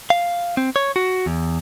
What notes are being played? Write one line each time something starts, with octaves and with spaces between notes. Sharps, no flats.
F5
C4
C#5
F#4
E2